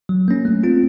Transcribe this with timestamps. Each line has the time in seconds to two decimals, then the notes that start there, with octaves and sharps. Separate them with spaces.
0.09 F#3
0.28 A#3 C#4
0.45 A3
0.63 C4 F4